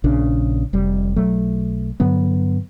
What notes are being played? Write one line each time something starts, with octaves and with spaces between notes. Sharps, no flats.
A#1 C#3 D4
F1 G3
B1 F#3 A3
G2 D3 F#3 B3